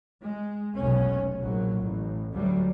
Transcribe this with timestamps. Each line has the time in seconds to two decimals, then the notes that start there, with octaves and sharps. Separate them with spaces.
0.22 G#3
0.77 F1 B1 C#4
1.40 A#1 F#3
1.81 A1
2.32 D2 F#3 G3